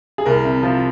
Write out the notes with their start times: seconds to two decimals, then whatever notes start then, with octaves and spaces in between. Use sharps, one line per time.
0.18 G#4
0.26 C2 A#4
0.45 C3
0.63 F3